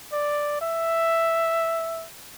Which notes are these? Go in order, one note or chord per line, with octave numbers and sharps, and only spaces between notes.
D5
E5